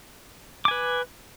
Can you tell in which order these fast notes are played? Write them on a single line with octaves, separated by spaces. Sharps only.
D6 G#5 B4